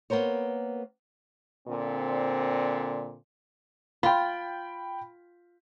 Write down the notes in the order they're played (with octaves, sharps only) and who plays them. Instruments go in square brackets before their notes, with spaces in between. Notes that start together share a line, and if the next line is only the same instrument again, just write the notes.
[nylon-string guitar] A#3 B3 A#4 C5 C#5
[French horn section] A#2 D3 C4
[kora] F4 [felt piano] G5 B5